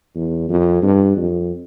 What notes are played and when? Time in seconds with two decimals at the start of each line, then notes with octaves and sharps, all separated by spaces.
0.16 E2
0.49 F2
0.82 G2
1.17 F2